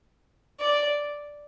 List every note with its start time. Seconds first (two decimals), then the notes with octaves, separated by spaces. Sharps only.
0.60 D5